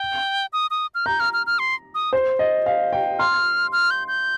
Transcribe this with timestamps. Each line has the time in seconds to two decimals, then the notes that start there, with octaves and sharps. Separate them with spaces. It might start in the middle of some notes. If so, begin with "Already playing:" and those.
Already playing: G5
0.53 D#6
0.71 D#6
0.95 F6
1.06 A#5 G6
1.20 F6
1.33 F6
1.46 F6
1.59 C6
1.95 D#6
2.13 C5
2.39 D#5
2.66 F5
2.93 G5
3.19 C6 F6
3.72 F6
3.91 G6
4.08 G6